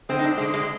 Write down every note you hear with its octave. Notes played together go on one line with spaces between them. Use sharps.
D3 G#3 C4
D#4
D4
D3 G#3
G#3